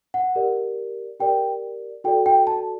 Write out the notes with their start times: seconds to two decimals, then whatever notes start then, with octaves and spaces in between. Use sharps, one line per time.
0.14 F#5
0.35 G4 A#4 D5
1.20 G4 A#4 D5 G5
2.04 F#4 A4 D5 G5
2.26 G5
2.47 A5